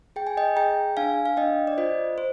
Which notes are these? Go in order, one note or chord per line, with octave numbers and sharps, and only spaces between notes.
G#4 G5
G#5
D#5 G5
G#4 G5 A#5
D4 F5 G#5
F5
D4 D#5 G5
D5
F4 C5 D#5
C5